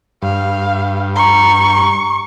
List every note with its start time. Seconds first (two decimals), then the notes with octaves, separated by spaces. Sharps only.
0.23 G2 F5
1.15 A#5 C#6